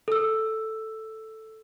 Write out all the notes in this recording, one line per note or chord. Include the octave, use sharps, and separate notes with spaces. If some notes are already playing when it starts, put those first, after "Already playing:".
A4 E6